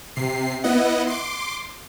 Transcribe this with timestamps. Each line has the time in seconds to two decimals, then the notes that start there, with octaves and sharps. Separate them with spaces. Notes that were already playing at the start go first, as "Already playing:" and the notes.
0.16 C3 C7
0.64 B3 E4 D#5 F#5
1.07 C6 D6